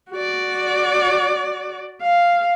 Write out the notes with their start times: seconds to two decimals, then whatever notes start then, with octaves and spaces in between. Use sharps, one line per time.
0.12 F#4 D5
2.01 F5